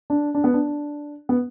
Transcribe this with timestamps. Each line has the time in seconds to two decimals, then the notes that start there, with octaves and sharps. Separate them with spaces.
0.10 D4
0.35 D4
0.44 B3
0.54 D4
1.29 B3